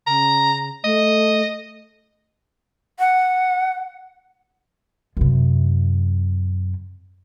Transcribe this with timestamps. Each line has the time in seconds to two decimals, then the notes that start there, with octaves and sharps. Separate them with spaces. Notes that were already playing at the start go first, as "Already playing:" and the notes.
0.07 C#3 A#5
0.84 A3 D#5
2.99 F#5
5.17 F#2 C3